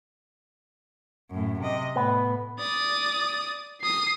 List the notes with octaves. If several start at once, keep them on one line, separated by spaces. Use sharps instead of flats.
F#2 A2
C3 D#5
A2 B3
D5 D#6
D#6 C7